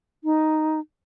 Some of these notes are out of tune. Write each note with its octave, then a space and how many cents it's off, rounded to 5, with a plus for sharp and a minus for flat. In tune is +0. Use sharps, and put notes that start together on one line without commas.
D#4 +0